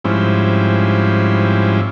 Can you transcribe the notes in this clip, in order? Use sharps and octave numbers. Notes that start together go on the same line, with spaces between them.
G#2 F3 G3 C4 C#4 E4